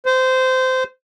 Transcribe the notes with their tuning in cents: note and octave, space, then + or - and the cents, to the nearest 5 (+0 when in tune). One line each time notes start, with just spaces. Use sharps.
C5 -20